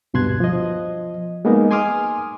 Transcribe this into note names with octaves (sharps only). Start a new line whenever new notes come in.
D2 G2 B2 C6 F#6 G#6
F3 D#5
G#3 A#3 B3 D#4 A#4
G#5 C6 D6 D#6 F6